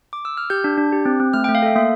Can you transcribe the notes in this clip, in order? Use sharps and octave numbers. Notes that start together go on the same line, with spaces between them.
D6
E6
F6
G4 G6
D4
D4
G4
C4
C4
A3 F6
A3 G5
F5
A4 E5
A#3 E5